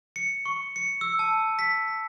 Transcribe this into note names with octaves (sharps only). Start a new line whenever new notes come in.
C#7
C#6
C#7
E6
A5
B6